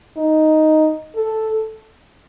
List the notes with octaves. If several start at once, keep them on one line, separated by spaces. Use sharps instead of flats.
D#4
A4